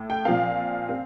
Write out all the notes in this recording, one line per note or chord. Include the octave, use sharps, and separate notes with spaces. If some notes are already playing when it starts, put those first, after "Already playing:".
Already playing: A2 A3
G5
A#2 F3 C4 F5
C4